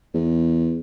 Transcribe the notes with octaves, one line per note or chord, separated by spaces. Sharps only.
E2